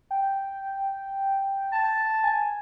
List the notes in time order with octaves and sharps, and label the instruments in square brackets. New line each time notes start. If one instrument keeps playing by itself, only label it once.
[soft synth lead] G5
[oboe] A5
[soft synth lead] G#5